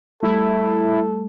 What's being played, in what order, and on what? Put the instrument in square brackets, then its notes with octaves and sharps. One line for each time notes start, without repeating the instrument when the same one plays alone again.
[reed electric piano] G3 A3 [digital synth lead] E4 [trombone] A4